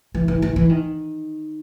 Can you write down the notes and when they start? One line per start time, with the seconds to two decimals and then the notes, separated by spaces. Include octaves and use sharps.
0.14 E3
0.28 E3
0.42 E3
0.56 E3
0.70 D#3